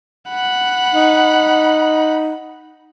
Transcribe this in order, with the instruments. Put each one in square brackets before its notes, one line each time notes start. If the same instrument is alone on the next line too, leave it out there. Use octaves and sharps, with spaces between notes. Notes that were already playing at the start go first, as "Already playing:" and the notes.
[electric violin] F#5 B5
[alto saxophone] D#4